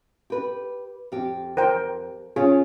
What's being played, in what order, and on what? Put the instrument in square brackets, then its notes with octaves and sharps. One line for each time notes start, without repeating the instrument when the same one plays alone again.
[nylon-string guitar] G4 B4
F2 G4
[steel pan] A#4 C5 G5
[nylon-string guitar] C#3 C#4 F4 [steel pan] G#4